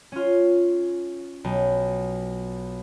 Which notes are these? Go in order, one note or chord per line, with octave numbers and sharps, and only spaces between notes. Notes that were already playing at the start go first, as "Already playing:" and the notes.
C#4 F4
B1